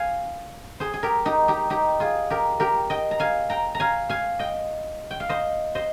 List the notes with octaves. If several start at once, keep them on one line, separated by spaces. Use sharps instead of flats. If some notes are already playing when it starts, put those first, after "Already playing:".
Already playing: F5 G#5
G#4 C5
G#4
G4 A#4
D#4 G4
D#4 G4
D#4 G4
F4 G#4
G4 A#4
G4 A#4
D#5 G5
A#5
F5 G#5
G5 A#5
A#5
F5 G#5
F5 G#5
D#5 G5
G5
F5
C5 D#5
C5 D#5